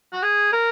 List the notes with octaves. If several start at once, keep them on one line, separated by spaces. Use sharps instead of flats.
F#4
G#4
A#4